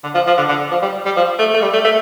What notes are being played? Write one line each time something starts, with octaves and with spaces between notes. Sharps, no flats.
D3
F3
F3
D3
D3
F3
G3
G3
F3
A3
A3
G3
A3
A3